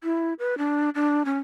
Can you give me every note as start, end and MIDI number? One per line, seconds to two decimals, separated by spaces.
0.04 0.34 64
0.39 0.58 71
0.58 0.90 62
0.95 1.23 62
1.25 1.38 61